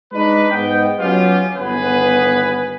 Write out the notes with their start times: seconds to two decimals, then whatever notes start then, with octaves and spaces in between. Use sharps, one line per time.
0.12 G#3 D4 D#4 B4
0.51 G#2 B3 D#5 G5
1.00 F#3 B3 C#4 F4 G4
1.56 G1 D#2 B3 G#4 B4